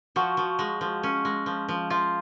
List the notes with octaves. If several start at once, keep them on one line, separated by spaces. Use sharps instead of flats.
F3 F#4
F3
G#3
F3
C#4
G#3
F3
F3
F3 F4